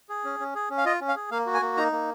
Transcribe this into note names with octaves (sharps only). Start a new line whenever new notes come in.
G#4
C#4
C#4
G#4
C#4
F5
F4 D#5
C#4
F5
G#4
A#3 F5
F#4
G#5
A#3
D#4 A#5
A#3